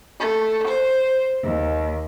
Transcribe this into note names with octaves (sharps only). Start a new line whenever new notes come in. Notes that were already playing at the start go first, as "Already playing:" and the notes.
A3
C5
D#2